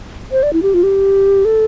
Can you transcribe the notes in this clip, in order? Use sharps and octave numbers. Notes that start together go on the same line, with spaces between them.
C5
D5
E4
G4
F4
G4
A4